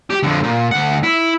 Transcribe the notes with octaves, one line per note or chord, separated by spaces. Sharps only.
G4
F2 D3
A#2
D2 F#5
E4